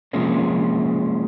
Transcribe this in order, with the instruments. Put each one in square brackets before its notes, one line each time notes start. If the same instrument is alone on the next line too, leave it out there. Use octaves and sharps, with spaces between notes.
[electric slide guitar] C3 F3 G#3 A#3 C#4